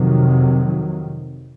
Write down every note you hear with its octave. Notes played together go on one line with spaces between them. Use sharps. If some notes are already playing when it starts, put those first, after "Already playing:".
Already playing: F2 C3 D#3 F#3